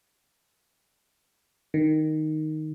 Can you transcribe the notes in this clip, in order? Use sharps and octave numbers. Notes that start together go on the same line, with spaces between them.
D#3